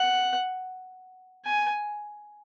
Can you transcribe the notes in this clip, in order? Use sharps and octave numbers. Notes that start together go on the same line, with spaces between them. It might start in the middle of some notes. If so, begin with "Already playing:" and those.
Already playing: F#5
G#5